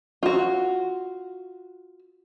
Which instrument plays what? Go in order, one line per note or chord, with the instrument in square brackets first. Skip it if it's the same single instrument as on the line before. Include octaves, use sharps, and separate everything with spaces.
[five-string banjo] F4 F#4